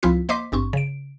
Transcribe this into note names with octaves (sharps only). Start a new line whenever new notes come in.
C#2 F3 C4 E4 F4 B6
A#3 C5 D#5 C6 D6 B6
G#1 G2 C4 C#6
C#3 D7